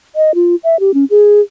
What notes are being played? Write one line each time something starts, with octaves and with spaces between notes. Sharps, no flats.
D#5
F4
E5
G4
C#4
G#4